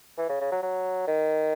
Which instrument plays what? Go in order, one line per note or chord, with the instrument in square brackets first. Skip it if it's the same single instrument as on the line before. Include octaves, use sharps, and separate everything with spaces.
[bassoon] E3
C#3
C#3
F#3
F#3
D#3